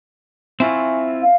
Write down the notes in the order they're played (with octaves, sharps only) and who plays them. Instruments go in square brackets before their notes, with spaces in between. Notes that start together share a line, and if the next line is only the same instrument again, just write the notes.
[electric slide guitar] C4 E4 F4 [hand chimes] E5 G#5 C#6
[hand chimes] E5
[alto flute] F5